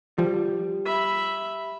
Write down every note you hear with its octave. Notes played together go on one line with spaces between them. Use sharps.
F3 G3
E5 B5